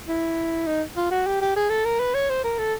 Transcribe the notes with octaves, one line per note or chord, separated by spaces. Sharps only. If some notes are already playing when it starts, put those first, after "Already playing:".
E4
D#4
F4
F#4
G4
G4
G#4
A4
A#4
B4
C#5
C5
A#4
A4